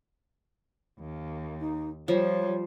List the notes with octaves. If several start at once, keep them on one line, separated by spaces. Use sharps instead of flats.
D#2
D#4
F3 G3 C#5